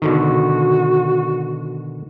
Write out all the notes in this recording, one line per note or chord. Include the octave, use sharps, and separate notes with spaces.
B2 D3 D#3 F#4